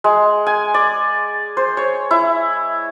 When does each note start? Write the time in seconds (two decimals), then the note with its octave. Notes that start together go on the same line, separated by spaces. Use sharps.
0.04 G#3
0.47 G#5
0.74 D5
1.57 C5
1.77 C#5
2.11 E4